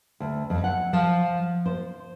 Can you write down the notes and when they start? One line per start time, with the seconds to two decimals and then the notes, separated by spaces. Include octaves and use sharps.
0.20 D2
0.50 F2
0.64 F#5
0.93 F3
1.66 C5